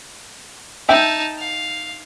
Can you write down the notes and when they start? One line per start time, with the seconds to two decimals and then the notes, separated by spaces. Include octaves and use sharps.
0.89 D#4 E5 G5 A5
1.39 F5